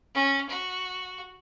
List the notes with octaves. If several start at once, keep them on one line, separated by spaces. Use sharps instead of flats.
C#4
F#4